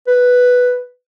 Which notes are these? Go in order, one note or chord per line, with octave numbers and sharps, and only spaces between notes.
B4